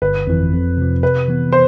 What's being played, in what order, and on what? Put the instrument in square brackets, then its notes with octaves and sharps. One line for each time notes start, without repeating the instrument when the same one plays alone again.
[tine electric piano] G1 [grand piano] B4
[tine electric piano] F2 E3
F2
C3 F3
[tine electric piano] C3 [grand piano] B4
[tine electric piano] E3 B3
[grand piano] C5